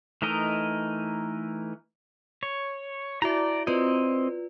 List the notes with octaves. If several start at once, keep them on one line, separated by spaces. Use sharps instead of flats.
E3 A3 D#4 A#4 D#5
C#5
E4 F#4 D5 E5 A#5
C4 F4 B4 D5 D#5